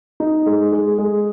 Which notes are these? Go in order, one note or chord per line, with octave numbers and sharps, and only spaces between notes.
D#4
G#3
G#3
G#3